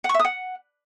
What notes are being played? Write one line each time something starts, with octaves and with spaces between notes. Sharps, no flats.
F#5
C#6
E5
D#6
F#5